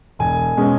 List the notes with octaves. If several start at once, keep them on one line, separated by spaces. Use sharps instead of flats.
E1 G#5
B2 G#3 C#4